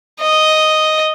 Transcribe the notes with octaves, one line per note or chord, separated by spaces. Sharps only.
D#5